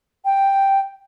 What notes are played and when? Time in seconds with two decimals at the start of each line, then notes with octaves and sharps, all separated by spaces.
0.25 G5